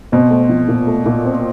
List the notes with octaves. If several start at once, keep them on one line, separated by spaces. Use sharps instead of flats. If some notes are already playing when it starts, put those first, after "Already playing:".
B2 C4
A3
F3
A#2
A3
A#2
C4